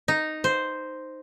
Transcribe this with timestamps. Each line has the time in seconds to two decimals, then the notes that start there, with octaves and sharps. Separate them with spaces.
0.08 D#4
0.44 C5